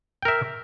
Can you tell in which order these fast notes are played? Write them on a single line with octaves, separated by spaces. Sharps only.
G5 A#4 E5